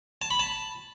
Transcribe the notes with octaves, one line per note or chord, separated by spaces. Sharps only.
A5
B5
A5